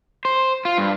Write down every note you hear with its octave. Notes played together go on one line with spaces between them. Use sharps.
C5
F4
G2